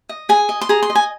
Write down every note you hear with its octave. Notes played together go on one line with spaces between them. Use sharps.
D#5
G#4 G#5
D#5
C6
G#4 A#5
C6
D#5
G#5